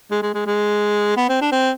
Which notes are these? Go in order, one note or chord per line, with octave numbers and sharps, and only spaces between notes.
G#3
G#3
G#3
G#3
B3
C4
D4
C4